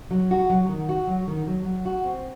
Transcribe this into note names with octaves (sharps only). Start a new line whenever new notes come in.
F#3
F#4
F#3
D#3
F#4
F#3
D#3
F#3
F#3
F#4
C4